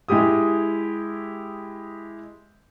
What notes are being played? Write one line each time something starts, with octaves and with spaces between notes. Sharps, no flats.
G#3 E4 G4 D#6